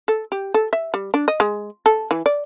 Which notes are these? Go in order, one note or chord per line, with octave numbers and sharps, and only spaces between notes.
A4
G4
A4
E5
G3
D4
D#5
G#3
A4
E3
D5